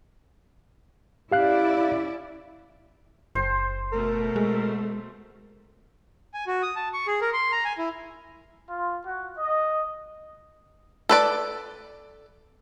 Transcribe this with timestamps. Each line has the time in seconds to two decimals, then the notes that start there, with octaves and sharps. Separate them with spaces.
1.32 C#4 E4 G4 D5 F5 F#6
3.35 F#1 C5
3.93 B2 A3 A#4
4.36 G#3
6.34 G#5
6.47 F#4
6.63 D#6
6.76 A5
6.94 C#6
7.07 G#4
7.21 A#4
7.33 C6
7.52 A#5
7.65 G#5
7.78 E4
8.69 F4
9.05 F#4
9.38 D#5
11.09 A4 B4 D5